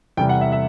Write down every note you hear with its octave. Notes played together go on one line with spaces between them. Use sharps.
E2 C3 G3 G5
F#5
E5
E5